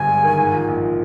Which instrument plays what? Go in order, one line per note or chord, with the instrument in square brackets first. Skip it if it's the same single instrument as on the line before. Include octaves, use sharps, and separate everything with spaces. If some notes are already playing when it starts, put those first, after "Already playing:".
Already playing: [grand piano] G1 G2 [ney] G#5
[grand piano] G#3
D#3
G#2
F3
A#1
F3